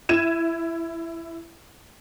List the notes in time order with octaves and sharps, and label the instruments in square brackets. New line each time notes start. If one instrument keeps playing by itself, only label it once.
[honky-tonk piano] E4 G#6 D#7 E7